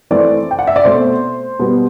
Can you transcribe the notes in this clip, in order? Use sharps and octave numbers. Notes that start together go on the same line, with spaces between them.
E3 A3 C4 D5
G5
F#5
E5
D5
B2 A3 C4 C5
B2 G3 B3